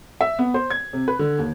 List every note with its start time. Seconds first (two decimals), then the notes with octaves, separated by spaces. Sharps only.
0.21 E5
0.39 B3
0.54 C5
0.70 G#6
0.93 C3
1.08 B4
1.19 D3
1.39 D#2